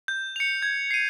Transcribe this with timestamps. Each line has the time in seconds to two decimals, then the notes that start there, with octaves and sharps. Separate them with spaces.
0.08 G6
0.36 C#7 F7
0.62 G#6
0.91 C7 D#7